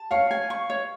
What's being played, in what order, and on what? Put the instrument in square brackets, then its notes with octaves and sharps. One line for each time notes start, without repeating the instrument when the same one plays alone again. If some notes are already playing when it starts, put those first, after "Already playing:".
Already playing: [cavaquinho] A5
[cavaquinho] C#5 [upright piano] F5
[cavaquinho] G#5
C#6
C#5